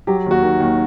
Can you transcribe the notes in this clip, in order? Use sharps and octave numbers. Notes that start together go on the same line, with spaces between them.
F#3 G4
D#2 F#4
D#3
D#2